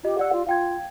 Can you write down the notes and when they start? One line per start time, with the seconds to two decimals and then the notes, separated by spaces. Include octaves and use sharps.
0.04 F4 G4 D#5
0.18 G4 D5 F#5 E6
0.32 F4
0.47 F4 F5 G5 G#6